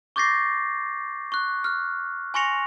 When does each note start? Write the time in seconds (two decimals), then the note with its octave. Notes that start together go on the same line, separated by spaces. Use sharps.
0.16 C#6 D6 G6 A6 A#6 C7
1.32 C#6 F#6
1.64 F6 F#6
2.34 G#5 C6 C#6 A#6 C#7 F7